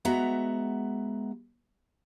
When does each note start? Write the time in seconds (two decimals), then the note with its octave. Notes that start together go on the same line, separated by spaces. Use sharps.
0.05 G#3 B3 F#4 E5 A#5